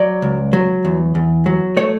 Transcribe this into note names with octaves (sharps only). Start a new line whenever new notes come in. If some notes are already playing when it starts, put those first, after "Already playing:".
Already playing: F#3 D5
C#2
F#3
E2
E2
F#3
A3 C#5